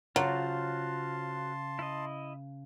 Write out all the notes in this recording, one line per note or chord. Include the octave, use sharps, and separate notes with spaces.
C#3 F#3 F4 F#4 C5 A5 C6
E4 D#5